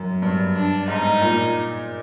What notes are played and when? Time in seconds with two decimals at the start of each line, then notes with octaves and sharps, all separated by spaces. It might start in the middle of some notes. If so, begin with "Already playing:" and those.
Already playing: F#2
0.22 G2
0.55 D4
0.88 G#2 D#4
1.21 A#2